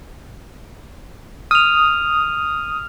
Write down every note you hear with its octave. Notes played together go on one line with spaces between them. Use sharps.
D#6 F6 F7